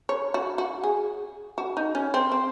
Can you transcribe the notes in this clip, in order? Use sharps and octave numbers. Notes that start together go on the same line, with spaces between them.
C#5
F#4
F#4
G#4
F#4
D#4
C#4
C4
C4